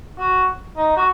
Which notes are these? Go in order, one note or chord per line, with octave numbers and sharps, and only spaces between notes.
F#4
D#4
F#4